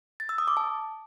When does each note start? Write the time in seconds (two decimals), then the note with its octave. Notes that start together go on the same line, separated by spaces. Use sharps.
0.20 A6
0.29 E6
0.38 D#6
0.48 D6
0.57 A5